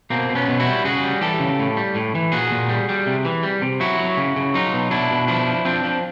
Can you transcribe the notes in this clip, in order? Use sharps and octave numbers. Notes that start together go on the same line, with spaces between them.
B2 A#3 C4
B2
B3 C#4
B2
E4 F#4
G3
C#3 F#4 G#4
G3
E3 G4 A4
C#3
A2
G3
A2
E3
A#2 F#4 G#4
A#2
G3
G3
C3
E3
G3
C3
F#3 E4 F#4
F#3
C#3
C#3
F#3 D#4 F4
B2
B2 D4 E4
B2
F3 D4 E4
F3
F3 C4 D4
F3